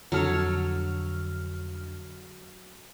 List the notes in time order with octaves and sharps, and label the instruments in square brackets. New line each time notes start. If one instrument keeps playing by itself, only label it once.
[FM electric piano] F2 D3 F6 [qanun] F#3 A4 C#5